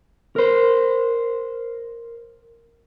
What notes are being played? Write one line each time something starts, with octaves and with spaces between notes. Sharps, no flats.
A#4 C5